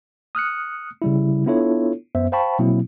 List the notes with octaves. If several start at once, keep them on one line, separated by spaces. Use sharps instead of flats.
D#6 F6 F#6 C#7
C#3 G3 E4
B3 D4 E4 F4 A4 C#5
F#2 B3 C5 E5
C5 F5 G5 A5 B5 C#6
B2 F#3 A#3 C4 E4